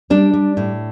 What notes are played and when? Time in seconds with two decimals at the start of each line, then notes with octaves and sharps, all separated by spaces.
0.10 G3 D4
0.33 G3
0.57 A2